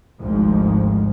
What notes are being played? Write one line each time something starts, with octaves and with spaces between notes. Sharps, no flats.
G#1 D2 G#2 F3 G#3